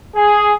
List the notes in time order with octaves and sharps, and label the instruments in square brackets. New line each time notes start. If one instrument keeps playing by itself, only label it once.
[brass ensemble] G#4